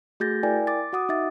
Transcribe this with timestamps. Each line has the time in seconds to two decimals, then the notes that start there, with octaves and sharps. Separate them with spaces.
0.20 A3 F#4 G#4 G6 A6 A#6
0.43 E4 A#4 D5 G5 G#5
0.67 D6 A6
0.93 F#4 F#5 D6 D#6
1.09 D#4 E5 A6